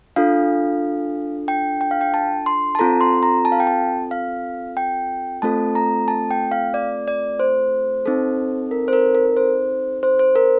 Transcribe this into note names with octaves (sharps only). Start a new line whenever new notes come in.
D4 F4 A4 F5
G5
G5
F5
G5
A5
C6
A5
C4 F4 A4 A#5
C6
A#5
A5
F5
G5
A5
F5
G5
A3 C4 F4 A4 A5
A#5
A5
G5
F5
D5
D5
C5
C4 D#4 A4
A#4
C5
A#4
A#4
C5
C5
C5
A#4